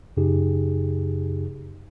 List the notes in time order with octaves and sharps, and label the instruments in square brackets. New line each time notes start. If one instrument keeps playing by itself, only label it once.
[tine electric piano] F#2 C#3 D#4 G4 G#4